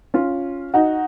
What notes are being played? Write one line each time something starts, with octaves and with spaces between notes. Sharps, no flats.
C#4 F4
D#4 F#4